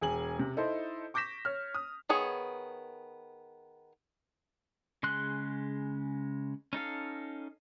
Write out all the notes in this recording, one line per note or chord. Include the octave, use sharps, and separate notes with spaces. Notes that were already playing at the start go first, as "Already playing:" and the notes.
E1 G#4 G#5 F#7
C3
D#4 E4 A4 C5
C#6 D6 G6 A#6 B6 E7
C#5 F6
D#6 F6
D#3 B3 G#4 C#5
C#3 G#3 C6 F#6
C#4 D#4 A4 F5